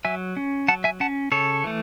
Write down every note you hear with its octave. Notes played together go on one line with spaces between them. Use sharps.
F#3 E5 G#5
C#4
F#3 F#5 A5
E5 G#5
C#4 F#5 A5
C#3 A4 C#5
E3 A3